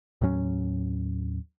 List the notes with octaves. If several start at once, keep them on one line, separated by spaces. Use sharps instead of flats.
D#2 A2 F#3 C#4